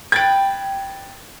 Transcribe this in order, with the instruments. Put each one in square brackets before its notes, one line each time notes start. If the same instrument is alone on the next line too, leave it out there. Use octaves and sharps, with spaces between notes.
[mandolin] B4 G5 [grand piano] G#6 A6 D7